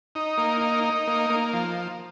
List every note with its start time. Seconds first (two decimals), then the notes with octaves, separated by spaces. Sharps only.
0.15 D#4
0.38 A#3
0.61 D#4
0.84 D#4
1.07 A#3
1.30 A#3
1.53 F3